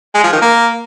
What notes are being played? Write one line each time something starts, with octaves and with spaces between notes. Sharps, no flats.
G#3
F3
D#3
A#3